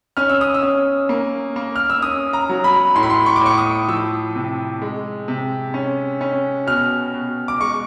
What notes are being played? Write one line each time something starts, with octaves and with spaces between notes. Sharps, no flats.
C#4 F6
E6
D#6
E6
C#4
A#3
A#3
F6
E6
C#4 D#6
A#5
F#3
B5
A2 C6
B5
C6
C#6
D6
A2 C#6
D#6
F3 E6
C3
G#3
C3
C#4
C#4
B2 F6
B2
D6
G#3 C#6